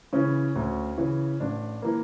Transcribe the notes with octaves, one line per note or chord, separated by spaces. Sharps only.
C#3 E3 C#4
D2
C#3 E3
A1 D4
E3 A#3